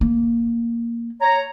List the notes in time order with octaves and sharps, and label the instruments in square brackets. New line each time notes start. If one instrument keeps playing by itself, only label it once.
[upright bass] A#3
[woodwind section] C#5 A#5